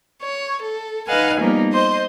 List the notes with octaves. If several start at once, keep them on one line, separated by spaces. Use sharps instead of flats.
C#5
A4
D#4 B4 D#5 F5 F#5 G#5
F3 G3 A#3 B3 D#4
C5 D#5 C6